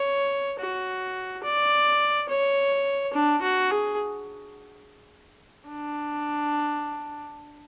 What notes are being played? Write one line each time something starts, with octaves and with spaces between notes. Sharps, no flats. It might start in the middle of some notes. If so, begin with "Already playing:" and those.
Already playing: C#5
F#4
D5
C#5
D4
F#4
G#4
D4